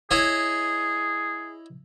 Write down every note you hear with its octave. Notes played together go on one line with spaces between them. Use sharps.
E4 G#4 C#5 D#5